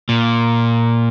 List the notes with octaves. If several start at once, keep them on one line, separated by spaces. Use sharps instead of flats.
A#2